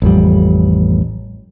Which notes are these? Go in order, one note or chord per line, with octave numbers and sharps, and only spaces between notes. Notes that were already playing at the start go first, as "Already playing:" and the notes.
A1 F2 G3